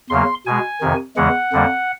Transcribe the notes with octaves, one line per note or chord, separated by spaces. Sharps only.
E2 C#3 F#3 A#3 C6
B2 G#3 G#5
F2 C3 D#3
E2 C#3 E3 G#3 F#5
F2 D3 G3 A#3